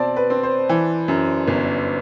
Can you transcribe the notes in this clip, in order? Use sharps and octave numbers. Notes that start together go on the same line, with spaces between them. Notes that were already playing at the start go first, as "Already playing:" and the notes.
Already playing: B2 C4 D5 A5
B4
C4
C5
E3
F#2
G1